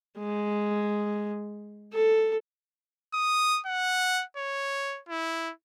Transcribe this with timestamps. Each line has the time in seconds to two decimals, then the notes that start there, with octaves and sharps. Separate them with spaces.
0.18 G#3
1.93 A4
3.14 D#6
3.66 F#5
4.37 C#5
5.09 E4